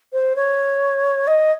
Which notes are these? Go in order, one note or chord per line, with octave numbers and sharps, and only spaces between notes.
C5
C#5
D#5